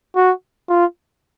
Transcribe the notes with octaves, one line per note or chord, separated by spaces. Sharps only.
F#4
F4